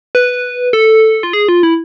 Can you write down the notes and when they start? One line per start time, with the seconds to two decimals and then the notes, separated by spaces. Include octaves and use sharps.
0.15 B4
0.73 A4
1.23 F4
1.33 G#4
1.49 F4
1.63 E4